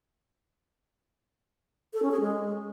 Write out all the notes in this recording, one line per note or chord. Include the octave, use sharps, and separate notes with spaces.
A4
C#4
G#4
G#3